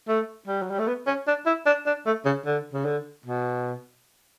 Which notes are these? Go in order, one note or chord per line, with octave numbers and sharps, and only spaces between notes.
A3
G3
F#3
G3
A3
B3
C#4
D4
E4
D4
D4
A3
C#3
D3
C#3
D3
B2